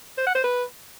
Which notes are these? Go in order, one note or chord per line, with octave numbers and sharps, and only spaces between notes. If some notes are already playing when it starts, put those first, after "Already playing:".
C5
F#5
C5
B4